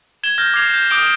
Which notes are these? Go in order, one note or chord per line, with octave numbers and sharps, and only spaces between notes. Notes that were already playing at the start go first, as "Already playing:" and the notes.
G#6 E7 G7
F6 G6 A#6 G7
D6 G#6 C7 F7
G6
D6 D#6 F6 G6 D7 G7